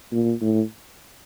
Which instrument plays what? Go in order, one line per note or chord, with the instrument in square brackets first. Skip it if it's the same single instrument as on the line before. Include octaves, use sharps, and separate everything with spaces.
[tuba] A#2
A2